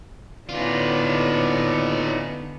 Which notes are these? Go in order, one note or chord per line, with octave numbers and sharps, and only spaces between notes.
A2 D3 B3 C#4 D#4 F4 D5